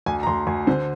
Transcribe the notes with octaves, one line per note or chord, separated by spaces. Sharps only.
D2 G#5
A#5
D2 C6
D2 G#5
D3 C5